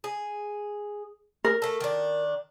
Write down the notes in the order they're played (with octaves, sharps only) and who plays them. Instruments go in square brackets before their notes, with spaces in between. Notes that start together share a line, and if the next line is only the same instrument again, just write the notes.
[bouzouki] G#4
[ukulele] A#4
[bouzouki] A3 A4
D#3 D4